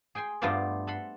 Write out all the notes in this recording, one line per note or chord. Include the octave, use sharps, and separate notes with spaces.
G#4 G5 G#5 C6
G2 A3 B3 F4 C5 D5
A4 F#5 B5 C6